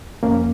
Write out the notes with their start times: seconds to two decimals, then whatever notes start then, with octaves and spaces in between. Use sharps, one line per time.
0.23 F2 A#3 C#4